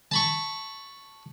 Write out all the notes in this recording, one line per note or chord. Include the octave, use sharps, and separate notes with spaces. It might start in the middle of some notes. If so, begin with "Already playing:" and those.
A5 B5 C#6